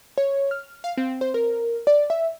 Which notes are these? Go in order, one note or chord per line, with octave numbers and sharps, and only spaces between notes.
C#5
F6
F5
C4
C5
A#4
D5
E5